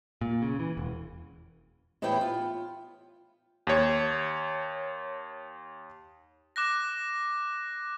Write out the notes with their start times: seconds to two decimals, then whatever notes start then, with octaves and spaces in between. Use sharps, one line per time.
0.21 A#2
0.42 C#3
0.59 E3
0.77 E1
2.02 E2 A2 B3 E4 G5
2.21 F4
3.67 D#2 C#5
6.56 D6 F#6 A#6